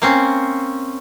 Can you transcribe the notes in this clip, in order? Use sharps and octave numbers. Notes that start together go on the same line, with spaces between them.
A#3 C4 C#4